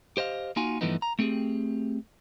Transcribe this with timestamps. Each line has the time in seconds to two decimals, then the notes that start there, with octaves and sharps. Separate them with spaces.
0.17 G4 C5 D#5 F5
0.56 A#3 D#4 F4 F#4 G#5
0.81 G2 E3 F3 A3 B3 D#4
1.02 A#5
1.19 A3 C4 G4 G#4